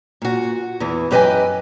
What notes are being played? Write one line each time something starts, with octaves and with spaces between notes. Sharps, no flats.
A#2 F#4
E2 E3
F#2 G4 B4 D#5 G5 G#5